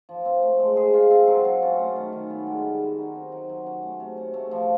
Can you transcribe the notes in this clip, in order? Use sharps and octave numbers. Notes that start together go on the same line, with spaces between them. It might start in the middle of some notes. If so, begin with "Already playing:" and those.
F3
C4
A3
G#3
G#4
F4
C4
F#3
F4
C#4
A3
D#3
D#3
B3
G#3
G3
F#4
D#4
C4
F#3
F#3
C#4
A3
C3
C#4
A3
F3